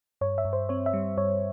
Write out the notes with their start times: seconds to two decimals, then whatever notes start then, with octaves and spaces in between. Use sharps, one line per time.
0.21 G2 C#5
0.38 E5
0.45 G2
0.53 C5
0.69 C4 C#5
0.86 E5
0.93 G3
1.17 G2 C#5